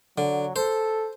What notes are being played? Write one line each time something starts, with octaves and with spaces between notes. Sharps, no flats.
D3 F#3
A4 C5